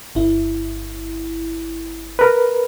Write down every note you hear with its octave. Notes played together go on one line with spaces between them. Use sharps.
G1 E4
A#4 B4